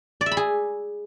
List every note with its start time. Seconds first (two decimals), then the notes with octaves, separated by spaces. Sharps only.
0.21 D5
0.26 E5
0.32 B5
0.37 G#4